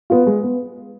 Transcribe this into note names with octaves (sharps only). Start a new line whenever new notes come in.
B3 F4
G#3
B3